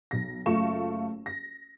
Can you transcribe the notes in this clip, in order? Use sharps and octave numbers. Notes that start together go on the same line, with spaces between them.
B1 A#6
F#1 A3 F4 C#6 E7
A#6